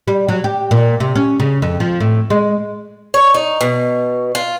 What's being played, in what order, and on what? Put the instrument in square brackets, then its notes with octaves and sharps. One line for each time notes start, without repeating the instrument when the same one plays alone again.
[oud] G3
F#3
G4
A#2
C3
C#4
C#3
F2
F3
A2
G#3
[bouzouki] C#5
D#4
B2
F4